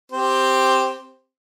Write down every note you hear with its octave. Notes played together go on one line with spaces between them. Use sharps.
C4 G4 C5